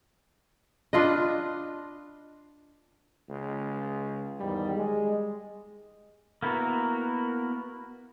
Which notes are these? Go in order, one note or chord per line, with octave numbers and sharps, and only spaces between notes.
D4 F4 B4 D#5
C#2
E2 G#2 D#3 G3
G#3
A#3 B3 E4 F#4 A#4